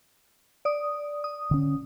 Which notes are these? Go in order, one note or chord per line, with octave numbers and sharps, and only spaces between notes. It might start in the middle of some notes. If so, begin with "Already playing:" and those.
D5 D#6
D#6
D3 C#4